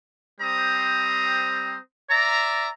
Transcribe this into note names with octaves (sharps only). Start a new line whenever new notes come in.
G3 C4 C5 A#5 D#6
D5 E5 A#5